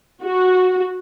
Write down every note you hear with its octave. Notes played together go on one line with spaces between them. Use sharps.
F#4